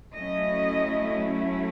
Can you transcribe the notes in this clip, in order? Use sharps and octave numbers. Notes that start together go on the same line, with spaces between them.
F#3 A3 C#4 E4 D#5